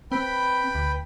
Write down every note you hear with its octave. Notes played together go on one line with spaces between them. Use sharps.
C4 B4 G5 B5
D2